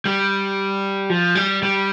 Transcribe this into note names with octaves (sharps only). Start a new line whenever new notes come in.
G3
F3
G3
G3